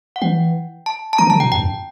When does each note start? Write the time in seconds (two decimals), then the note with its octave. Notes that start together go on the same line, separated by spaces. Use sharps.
0.16 F#5
0.22 E3 G5
0.86 A5
1.13 A5
1.18 D#3 A#5
1.27 D3
1.30 A5
1.35 C#3
1.40 G5
1.43 B2
1.51 F#2 G5
1.59 F2